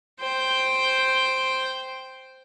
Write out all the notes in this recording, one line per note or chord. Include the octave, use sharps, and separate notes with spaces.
C5 G5